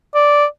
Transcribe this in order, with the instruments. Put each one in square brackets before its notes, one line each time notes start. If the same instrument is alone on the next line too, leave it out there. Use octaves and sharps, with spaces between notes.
[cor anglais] D5